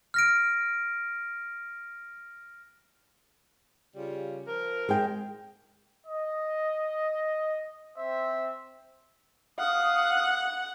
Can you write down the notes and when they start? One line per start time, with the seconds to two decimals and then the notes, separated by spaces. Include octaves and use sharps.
0.14 F6 A#6 D7
3.96 C#3 G3 F4
4.47 F3 A#4
4.89 G#3 G5
6.06 D#5
7.97 C4 C5 E5
9.59 F5 F#5 D#6